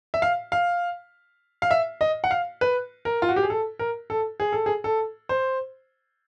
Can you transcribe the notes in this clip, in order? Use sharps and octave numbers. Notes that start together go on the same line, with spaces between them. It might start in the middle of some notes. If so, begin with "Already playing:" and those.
E5
F5
F5
F5
E5
D#5
F#5
F5
B4
A#4
F4
F#4
G4
G#4
A4
A#4
A4
G#4
A4
G#4
A4
C5